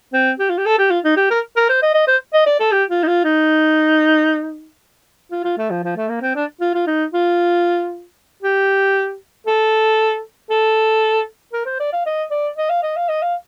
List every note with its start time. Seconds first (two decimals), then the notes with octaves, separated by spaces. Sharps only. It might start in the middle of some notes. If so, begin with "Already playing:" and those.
0.13 C4
0.39 G4
0.49 F4
0.58 G4
0.66 A4
0.79 G4
0.90 F4
1.04 D#4
1.16 G4
1.30 A#4
1.56 A#4
1.69 C5
1.82 D#5
1.94 D#5
2.07 C5
2.34 D#5
2.46 D5
2.60 A4
2.72 G4
2.90 F4
3.03 D#4
3.07 F4
3.24 D#4
5.31 F4
5.44 F4
5.58 A3
5.70 F3
5.84 F3
5.97 A3
6.09 A#3
6.22 C4
6.36 D4
6.61 F4
6.74 F4
6.87 D#4
7.13 F4
8.43 G4
9.47 A4
10.50 A4
11.53 A#4
11.66 C5
11.80 D5
11.93 F5
12.06 D#5
12.31 D5
12.57 D#5
12.70 F5
12.83 D#5
12.96 F5
13.09 D#5
13.22 F5